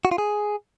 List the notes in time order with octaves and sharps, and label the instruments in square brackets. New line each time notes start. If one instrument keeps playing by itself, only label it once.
[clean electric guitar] F#4
F4
G#4